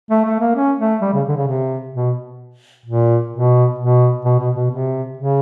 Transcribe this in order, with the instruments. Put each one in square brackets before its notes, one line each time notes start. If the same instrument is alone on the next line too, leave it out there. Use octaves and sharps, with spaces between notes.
[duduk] A3
A3
A#3
C#4
A3
G3
C#3
D3
C#3
C3
B2
A#2
B2
B2
B2
B2
B2
C3
C#3